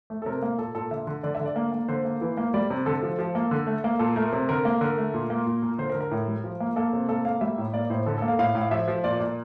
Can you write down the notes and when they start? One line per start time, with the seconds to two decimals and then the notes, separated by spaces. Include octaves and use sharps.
0.10 A3
0.22 A4
0.26 C3 A#4
0.42 A#3
0.58 A#2 A4
0.75 A#2 A4
0.91 D3 E5
1.07 D3
1.23 D3 D5
1.35 E5
1.40 D3
1.46 D5
1.56 A#3
1.72 A#3
1.88 D3 C5
2.05 A#3
2.21 E3
2.37 A#3
2.54 G3 D5
2.70 C3
2.86 D3 A4
3.03 F3
3.19 F3
3.35 A#3
3.51 D3
3.67 A3
3.84 A#3
3.99 A#2 A4
4.16 A3 A#4
4.32 C3
4.49 D3 A#4
4.65 A#3
4.81 D3 A#4
4.98 A3
5.14 A#2
5.30 A#3
5.46 A#2
5.62 A#2
5.78 D3 C5
5.90 A#4
5.95 D3
6.01 A#4
6.11 A2
6.28 G3
6.44 F3
6.60 A#3
6.76 A#3 A4
6.93 C3
7.09 A#3 A4
7.25 A#3 F5
7.41 G3 E5
7.58 A2
7.73 A#3 D5
7.90 A2 C5
8.06 D3 A4
8.18 A#3 A4
8.28 F5
8.39 A2 F5
8.55 A2
8.62 F5
8.71 F3 E5
8.88 F3
9.04 A#2 D5
9.20 A#2 D5